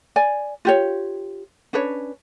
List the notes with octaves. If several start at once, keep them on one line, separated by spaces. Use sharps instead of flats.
D5 G#5
F4 G4 C#5
C#4 D4 B4 C#5